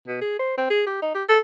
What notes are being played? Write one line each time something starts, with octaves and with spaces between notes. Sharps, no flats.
B2
G#4
C5
C4
G#4
G4
D#4
G4
A4